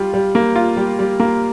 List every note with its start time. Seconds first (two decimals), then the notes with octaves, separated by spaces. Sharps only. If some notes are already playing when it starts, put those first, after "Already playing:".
Already playing: G3 F4
0.14 G3
0.35 A#3
0.56 F4
0.77 G3
0.99 G3
1.20 A#3